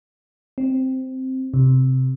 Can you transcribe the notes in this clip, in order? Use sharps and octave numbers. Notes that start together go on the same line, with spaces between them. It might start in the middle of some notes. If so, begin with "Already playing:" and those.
C4
C3